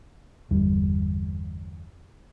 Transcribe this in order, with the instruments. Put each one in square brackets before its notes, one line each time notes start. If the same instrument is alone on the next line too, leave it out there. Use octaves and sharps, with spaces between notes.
[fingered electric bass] G1 E2 G3